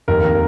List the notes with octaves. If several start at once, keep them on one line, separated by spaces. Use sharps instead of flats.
F1 D#2 D#3 A#4
A#4